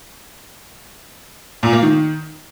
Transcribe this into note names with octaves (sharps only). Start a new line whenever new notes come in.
A#2
A#3
D#3